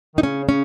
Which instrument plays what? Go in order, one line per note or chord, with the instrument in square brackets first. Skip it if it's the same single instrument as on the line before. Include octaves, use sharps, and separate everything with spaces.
[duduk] D#3 [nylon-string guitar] D#4
[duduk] C#3 [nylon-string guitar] C#4
[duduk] C#3 [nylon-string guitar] C#4